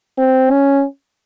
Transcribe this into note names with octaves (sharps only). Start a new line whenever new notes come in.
C4
C#4